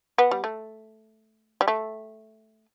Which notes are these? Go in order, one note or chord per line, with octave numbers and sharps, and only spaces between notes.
B3
G3
A3
G3
A3